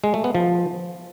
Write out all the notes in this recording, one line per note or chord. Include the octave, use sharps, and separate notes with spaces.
G#3
A3
B3
F3